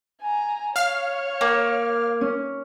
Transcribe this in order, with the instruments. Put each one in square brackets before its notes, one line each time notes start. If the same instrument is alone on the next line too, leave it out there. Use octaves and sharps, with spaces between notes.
[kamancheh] G#5 A#5
[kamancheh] C#5 [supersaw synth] F5 F6
[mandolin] A#3
[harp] C#4